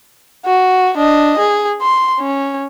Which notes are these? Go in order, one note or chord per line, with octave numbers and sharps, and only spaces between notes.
F#4
D4 D#5
G#4
C6
C#4